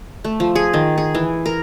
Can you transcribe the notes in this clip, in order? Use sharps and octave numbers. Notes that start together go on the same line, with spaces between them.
A3
F3
G#4
D#3
G#4
E3
A#4